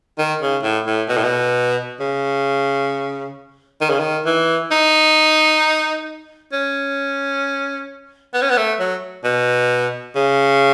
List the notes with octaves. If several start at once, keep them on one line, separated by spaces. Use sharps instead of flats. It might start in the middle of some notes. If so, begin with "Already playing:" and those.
D#3
C#3
A2
A2
B2
A2
B2
C#3
D#3
C#3
D#3
E3
D#4
C#4
B3
C#4
B3
A3
F#3
B2
C#3